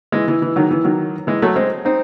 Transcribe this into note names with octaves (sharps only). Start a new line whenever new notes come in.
E3 G#3
E3
E3
D#3 F#3
E3
D#3 F#3
E3 G#3
F#3 A3
G#3 C4
C4 D#4